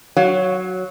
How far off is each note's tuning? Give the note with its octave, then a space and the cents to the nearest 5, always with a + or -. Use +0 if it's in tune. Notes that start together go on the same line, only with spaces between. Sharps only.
F#3 +0 C#5 +0 F5 +25